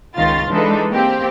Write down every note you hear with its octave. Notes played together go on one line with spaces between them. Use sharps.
C#2 D#3 F4 A6
E3 G#3 D4 D#4 A4 B4
A#3 C4 G4